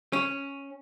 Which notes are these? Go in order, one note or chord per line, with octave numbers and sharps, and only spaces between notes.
C#4